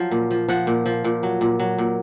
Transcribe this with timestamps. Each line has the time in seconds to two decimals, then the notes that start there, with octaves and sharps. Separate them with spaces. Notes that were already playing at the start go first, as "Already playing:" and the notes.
Already playing: F3 F#3
0.11 A#2
0.31 F3
0.49 F3 F#5
0.67 A#2
0.86 F3
1.04 A#2
1.23 F#3
1.41 A#2
1.60 F#3
1.78 A#2